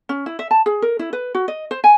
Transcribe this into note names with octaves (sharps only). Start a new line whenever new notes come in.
C#4
E4
E5
A5
G#4
A#4
E4
B4
F#4
D#5
C5
G#5